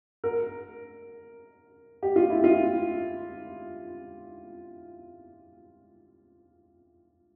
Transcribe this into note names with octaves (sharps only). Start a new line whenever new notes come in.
A#4
G4
F4
E4
F4